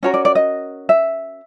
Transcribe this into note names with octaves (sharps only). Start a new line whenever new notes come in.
C#4 F#4 A#4 C#5
D5
D5
D#5
E5